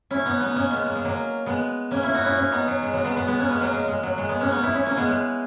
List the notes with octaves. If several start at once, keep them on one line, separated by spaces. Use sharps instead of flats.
C#4 E4
B3 D#4
B3 D#4
A#3 C#4
G#3 B3
A#3
G#3
F#3 A#3
G#3 B3
A#3 C#4
C#4 E4
D#4 F#4
C#4 E4
C#4 E4
B3 D#4
F#3
G#3
F#3 A#3
G#3 B3
G#3 B3
G#3 B3
A#3 C#4
G#3 B3
F#3 A#3
G#3
G#3
F#3
G#3
G#3 B3
A#3 C#4
B3 D#4
C#4 E4
C#4 E4
A#3 C#4
G#3 B3
G#3